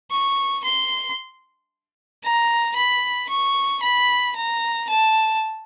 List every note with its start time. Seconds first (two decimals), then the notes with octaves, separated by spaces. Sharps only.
0.10 C#6
0.63 C6
2.23 A#5
2.76 B5
3.29 C#6
3.82 B5
4.36 A#5
4.89 A5